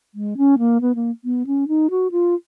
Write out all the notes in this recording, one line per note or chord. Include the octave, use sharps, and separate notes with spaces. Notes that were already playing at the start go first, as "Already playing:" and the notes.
G#3
C#4
A#3
B3
A#3
B3
C#4
D#4
F#4
F4